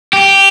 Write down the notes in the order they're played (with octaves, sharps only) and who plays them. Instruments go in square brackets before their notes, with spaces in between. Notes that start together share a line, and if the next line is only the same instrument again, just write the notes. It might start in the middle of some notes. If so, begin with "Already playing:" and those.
[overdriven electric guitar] G4